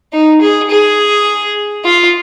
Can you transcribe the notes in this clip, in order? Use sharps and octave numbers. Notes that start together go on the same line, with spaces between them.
D#4
G#4
G#4
F4